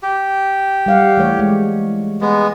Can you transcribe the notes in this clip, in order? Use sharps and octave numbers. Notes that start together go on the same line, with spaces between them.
G4
G3 F5 F#5
E3 A3 C#5
G#3
G#3 B3